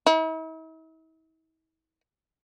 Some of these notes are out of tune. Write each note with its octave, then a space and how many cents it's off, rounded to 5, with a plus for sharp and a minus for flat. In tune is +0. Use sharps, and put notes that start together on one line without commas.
E4 -45